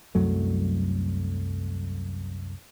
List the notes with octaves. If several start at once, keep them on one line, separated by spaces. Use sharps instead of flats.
C2 F#2 F#3 A3